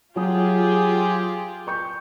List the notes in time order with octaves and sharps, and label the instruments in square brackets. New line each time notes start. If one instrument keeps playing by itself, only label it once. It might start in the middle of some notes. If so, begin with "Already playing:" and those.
[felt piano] F#3 G#5 D#6 [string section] F4 G4 G#4
[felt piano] G5 C#6 G6